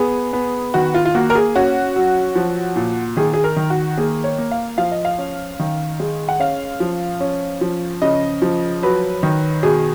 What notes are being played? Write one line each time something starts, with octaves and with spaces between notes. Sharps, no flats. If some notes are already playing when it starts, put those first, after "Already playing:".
Already playing: B3 G#4
B3
D#3 F#4
F4
F4
A#3 F#4
A#4
G#4
C#4 F#4
F#3
F3
A#2
D#3 G#4
G#4
A#4
D#3
F#4
A#3 G#4
C#5
A#3
F5
F3 F5
D#5
F5
C#4
D#3
G#3
F#5
C#4 F5
F3
C#4
F3
C#3 D#5
F3
F#3 B4
D#3
B2 G#4